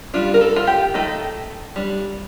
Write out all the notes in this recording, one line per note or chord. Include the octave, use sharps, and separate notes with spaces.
G3 D4 F4
A#4
A4
F4
G4
D#3 A3 D#4 A4
G3 D4